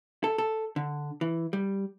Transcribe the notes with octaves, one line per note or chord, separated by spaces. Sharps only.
A4
A4
D3
E3
G3